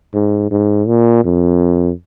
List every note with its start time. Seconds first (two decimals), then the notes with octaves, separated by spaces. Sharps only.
0.14 G#2
0.51 G#2
0.87 A#2
1.25 F2